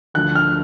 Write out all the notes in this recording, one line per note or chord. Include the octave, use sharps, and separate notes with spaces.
D2 D3 F3 F#6
F6